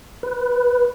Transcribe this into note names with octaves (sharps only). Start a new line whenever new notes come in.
B4